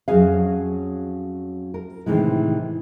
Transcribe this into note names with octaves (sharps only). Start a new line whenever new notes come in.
F2 F#3 C#4 F#4 G#4 F5
A#4
A2 C3 D#3 E3 G#3